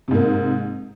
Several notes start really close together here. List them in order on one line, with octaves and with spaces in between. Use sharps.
C3 G#2 A#3